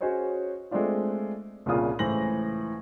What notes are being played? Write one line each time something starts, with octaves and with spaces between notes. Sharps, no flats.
C#4 F#4 G#4 C5 C#5 D#5
G#3 A3 C4 D4 F4
C2 A#2 C#3 F4 D#6
C#2 A2 E3 C5 A#6 F#7